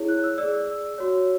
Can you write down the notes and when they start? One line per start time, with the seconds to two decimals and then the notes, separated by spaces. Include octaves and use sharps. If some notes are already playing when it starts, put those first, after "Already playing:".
Already playing: E4 G#4 C#5
0.08 F#6
0.23 E6
0.38 D5 E6
0.43 G#4
0.53 E6
0.98 F#4 C#5